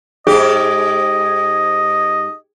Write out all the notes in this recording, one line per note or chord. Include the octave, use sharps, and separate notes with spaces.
G#2 G4 G#4 D#5